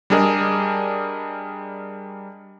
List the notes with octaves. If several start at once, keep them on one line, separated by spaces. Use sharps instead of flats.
G3 D4 G#4 A#4 D#5